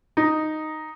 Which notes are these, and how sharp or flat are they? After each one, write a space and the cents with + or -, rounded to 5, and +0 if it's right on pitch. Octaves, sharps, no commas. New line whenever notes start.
D#4 -5